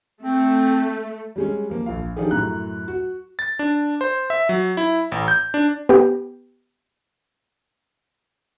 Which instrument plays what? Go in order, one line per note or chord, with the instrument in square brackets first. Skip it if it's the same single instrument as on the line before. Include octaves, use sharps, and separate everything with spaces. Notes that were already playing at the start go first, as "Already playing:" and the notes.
[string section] A3 [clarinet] C4
[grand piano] G3 G#3 C#4
F3 A#3
A#1 F4 F5
F3 D4 D#4 F4 G4 G#4
F#2 A2 A#5 F#6
F#4
[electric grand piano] A6
D4
C5
E5
F#3
E4
A1
G6
D4
[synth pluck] B3 G4